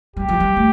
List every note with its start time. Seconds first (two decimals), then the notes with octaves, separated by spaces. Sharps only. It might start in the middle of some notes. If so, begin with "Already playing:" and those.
0.16 G3 G4
0.29 F3
0.40 G3
0.57 A3